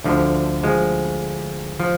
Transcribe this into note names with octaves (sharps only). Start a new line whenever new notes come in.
D2 D3 F3
F3 G#3
F3